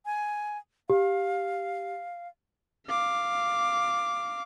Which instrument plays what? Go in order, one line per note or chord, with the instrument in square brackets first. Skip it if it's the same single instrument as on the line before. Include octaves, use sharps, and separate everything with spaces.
[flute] G#5
[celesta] G4 [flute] F5
[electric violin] F5 D6